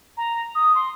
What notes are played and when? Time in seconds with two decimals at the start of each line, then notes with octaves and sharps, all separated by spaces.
0.17 A#5
0.55 D#6
0.75 C6